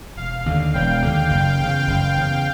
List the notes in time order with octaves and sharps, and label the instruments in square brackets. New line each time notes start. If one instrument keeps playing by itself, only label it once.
[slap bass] E1 [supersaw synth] F5
[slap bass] D#2 D3
[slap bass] E1 [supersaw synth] G5
[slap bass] D#2 D3
F#1
E2 C#3
F#1
E2 C#3